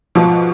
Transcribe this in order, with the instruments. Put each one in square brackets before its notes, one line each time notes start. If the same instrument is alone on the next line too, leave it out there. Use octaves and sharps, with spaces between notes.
[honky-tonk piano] G#2 B2 [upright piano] F3